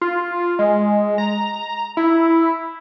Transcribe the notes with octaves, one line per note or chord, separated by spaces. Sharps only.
F4
G#3
A#5
E4